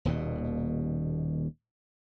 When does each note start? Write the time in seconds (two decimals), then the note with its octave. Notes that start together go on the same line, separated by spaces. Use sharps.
0.05 D#1 D#2 B2